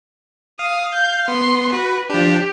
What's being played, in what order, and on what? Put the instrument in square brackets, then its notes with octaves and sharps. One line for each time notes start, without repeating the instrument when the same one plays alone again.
[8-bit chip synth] F5 [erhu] D#6
[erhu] G6
[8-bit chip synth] B3 [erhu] C6
[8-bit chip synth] F#4 [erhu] B4
[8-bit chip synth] F3 D4 [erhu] G4